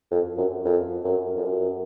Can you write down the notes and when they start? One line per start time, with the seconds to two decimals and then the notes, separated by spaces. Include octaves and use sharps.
0.11 F2
0.38 F#2
0.65 F2
1.05 F#2
1.36 F2
1.45 F#2